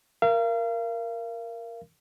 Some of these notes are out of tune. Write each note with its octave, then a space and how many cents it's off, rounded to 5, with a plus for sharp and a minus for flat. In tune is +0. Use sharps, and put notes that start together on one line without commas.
A#4 +0 F5 -35